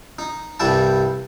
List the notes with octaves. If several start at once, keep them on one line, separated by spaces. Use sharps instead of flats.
D#4
C2 G2 G3 E4 G5 A5